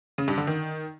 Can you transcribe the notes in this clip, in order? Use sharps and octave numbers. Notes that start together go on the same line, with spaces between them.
C#3
G2
D3
D#3